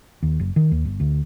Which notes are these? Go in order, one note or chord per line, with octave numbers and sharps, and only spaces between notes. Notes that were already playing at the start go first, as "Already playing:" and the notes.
D#2
F#1
D#3
D#2
G1
D2